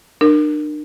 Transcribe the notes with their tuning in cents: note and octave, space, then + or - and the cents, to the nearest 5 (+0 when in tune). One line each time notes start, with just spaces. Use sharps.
D4 +40 A#4 +0